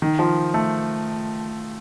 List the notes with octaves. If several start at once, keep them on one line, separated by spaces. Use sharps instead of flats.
D#3
F3
A3